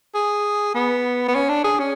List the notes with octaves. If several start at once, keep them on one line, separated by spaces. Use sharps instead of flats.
G#4
B3
B3
C#4
D4
G#4
C#4